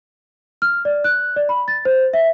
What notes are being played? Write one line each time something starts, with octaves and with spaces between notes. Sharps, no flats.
F6
D5
F#6
D5
B5
A6
C5
E5